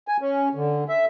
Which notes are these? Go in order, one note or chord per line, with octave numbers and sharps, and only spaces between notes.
G#5
C#4
D3
E5